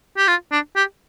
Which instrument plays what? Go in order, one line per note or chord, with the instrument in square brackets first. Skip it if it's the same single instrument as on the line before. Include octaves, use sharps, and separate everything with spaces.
[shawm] G4
F4
D4
G4